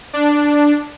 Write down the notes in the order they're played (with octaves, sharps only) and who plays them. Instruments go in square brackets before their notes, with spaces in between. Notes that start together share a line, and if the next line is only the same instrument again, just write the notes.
[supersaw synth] D4